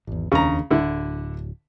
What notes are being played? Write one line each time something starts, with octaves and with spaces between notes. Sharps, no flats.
G#1 E2
F1 D#2 C#3 D4 A#5
D1 D3 E4